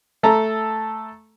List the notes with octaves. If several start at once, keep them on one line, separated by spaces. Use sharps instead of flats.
A3 A4 A#5